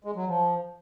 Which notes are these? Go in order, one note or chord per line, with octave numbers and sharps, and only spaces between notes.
G#3
F#3
F3